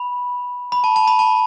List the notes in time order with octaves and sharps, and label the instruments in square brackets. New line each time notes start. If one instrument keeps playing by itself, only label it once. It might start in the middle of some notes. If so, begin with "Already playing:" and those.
Already playing: [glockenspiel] B5
B5
A5
A5
B5
A5